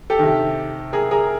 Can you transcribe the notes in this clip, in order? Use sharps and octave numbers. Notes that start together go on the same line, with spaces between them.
G4 A4
C3 D#3
G#4 A#4
G#4 A#4